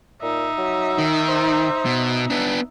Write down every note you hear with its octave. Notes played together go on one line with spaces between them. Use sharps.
A#2 D#4 E5
F#3
D#3
C5
B2
B3 D4